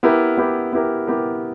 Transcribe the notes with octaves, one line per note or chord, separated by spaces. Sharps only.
B3 E4 G4 A#4
B3 E4 G4 A#4
B3 E4 G4 A#4
B3 E4 G4 A#4